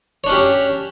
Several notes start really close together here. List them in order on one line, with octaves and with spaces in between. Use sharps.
C#5 D4 C#4 G4